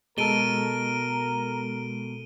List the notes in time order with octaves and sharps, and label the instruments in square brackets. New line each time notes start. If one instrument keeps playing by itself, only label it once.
[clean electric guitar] B2 [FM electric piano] G#3 A4 [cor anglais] A#4 [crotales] D7 D#7 G7